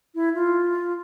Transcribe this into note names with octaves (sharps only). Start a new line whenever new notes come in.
E4
F4